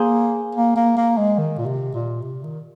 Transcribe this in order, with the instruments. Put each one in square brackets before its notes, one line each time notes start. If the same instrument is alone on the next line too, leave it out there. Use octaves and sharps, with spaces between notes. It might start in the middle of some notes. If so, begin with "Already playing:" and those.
Already playing: [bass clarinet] A#3 [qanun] G#4 C5
[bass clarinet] A#3
A#3
A#3
G#3
D#3
A#2
C3
A#2
C3
D#3